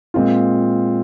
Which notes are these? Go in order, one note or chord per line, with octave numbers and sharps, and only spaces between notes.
A#2 G#3 C4 F4